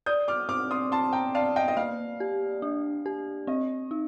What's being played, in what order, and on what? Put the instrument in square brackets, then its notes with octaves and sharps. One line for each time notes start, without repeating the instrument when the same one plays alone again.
[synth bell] D5 [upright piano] D#6 G6
[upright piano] D6 F6
[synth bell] C4 [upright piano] D6 F6
[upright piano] C6 D#6
[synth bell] C4 [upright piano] A5 C6
[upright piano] G5 A#5
[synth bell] D5 [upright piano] F5 A5
[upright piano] D#5 G5
D#5
[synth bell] A#3 [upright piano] F5
[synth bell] G4
D4
G4
[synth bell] C4 [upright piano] D#5
[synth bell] D#4